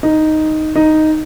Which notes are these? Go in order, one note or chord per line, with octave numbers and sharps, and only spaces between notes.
D#4
D#4